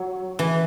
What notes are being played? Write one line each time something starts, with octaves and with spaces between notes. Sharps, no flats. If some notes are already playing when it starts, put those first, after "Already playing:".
Already playing: F#3
E3